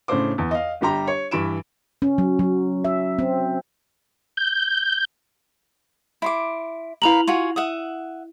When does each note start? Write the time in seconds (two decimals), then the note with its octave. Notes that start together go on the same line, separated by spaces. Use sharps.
0.08 A2 C#3 D4 C5 D6
0.38 E2
0.51 D#5 F5
0.81 G1 G3 G4 A#5
1.07 C#5
1.31 G2 E3 B5 D7 E7
2.02 C#4
2.18 F#3
2.39 F#3
2.85 E5
3.19 C4
4.37 G6
6.22 E4 C6 D6
7.02 E4 A#4 B4 F5 F7 F#7
7.28 F4 F#4 G#5
7.56 E5 F#5 D#6